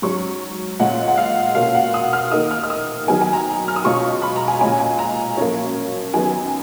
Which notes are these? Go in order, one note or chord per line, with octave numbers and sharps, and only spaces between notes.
G#2 F#3 C#4 C#6
A#2 G#3 C#4 F#5
F#5
F5
B2 A#3 C#4 F4 F5
F#5
D#6
F6
D#3 A#3 D#4 D#6
F6
F6
D#6
D#3 F#3 B3 G#5
G#5
A#5
F6
D#6
B2 G#3 C#4 F4 C#6
B5
A#5
G#5
A#2 G#3 C#4 G#5
G#5
A#5
F#2 F3 A#3 C#5
F#2 D#3 F#3 B3 G#5